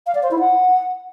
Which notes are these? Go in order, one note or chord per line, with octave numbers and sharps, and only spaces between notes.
F5
D5
C5
E4
F#5